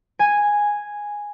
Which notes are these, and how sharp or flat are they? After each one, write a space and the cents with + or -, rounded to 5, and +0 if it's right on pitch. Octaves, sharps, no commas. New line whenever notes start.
G#5 -5